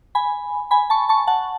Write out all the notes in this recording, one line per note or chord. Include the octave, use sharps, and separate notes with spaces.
G#5 B5
G#5 B5
A5 C#6
A5 C#6
F#5 A5